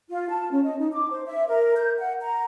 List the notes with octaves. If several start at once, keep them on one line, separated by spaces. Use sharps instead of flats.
F4
A5
C#4
D#5
D#4
D6
C5
E5
A#4
G6
F#5
A#5